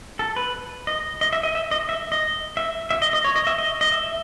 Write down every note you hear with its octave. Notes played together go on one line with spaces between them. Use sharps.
A4
B4
D#5
D#5
E5
D#5
E5
D#5
E5
D#5
E5
E5
D#5
D#5
C#5
D#5
E5
D#5
D#5
E5